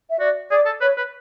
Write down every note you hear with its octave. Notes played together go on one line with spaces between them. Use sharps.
E5
F#4 D5
G#4 D5
A4
B4 C#5
B4